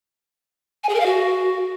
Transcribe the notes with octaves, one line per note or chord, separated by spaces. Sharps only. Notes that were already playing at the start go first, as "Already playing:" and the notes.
G#5
G#4
A#4
F5
F#4